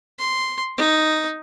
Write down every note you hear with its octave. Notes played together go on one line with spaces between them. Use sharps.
C6
D#4